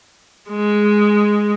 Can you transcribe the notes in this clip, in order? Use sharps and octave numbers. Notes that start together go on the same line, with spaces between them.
G#3